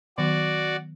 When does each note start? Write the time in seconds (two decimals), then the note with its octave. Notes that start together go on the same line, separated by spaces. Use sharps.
0.18 D#3 F#3 B3 F#4 D5